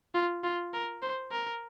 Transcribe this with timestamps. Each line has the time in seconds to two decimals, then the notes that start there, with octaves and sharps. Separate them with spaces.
0.15 F4
0.44 F4
0.73 A#4
1.02 C5
1.32 A#4